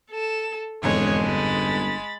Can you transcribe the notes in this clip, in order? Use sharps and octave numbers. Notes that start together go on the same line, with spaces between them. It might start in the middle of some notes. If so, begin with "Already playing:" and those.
A4 E7
E1 F2 G#2 D3 G#3 C#5
G1 B5 A6